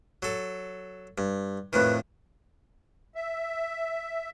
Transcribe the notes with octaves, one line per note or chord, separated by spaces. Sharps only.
F#3 A4
G2
F2 A2 D#3 B4
E5